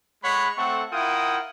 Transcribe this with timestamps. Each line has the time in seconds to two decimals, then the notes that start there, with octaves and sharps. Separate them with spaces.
0.24 G#3 C#5 F#5 B5
0.57 A3 C4 A4 F#5 C#6
0.92 E4 F4 A#4 F#5 G5 D#6